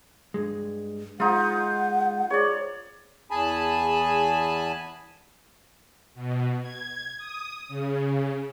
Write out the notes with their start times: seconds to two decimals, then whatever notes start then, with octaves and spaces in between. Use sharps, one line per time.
0.34 G2 G#3
1.20 G#3 D#4 F4 F#5
2.30 G#4 C#5 D5
3.31 E2 G#4 G#5 A5 B5
6.14 B2
6.61 G#6
7.17 D#6
7.68 C#3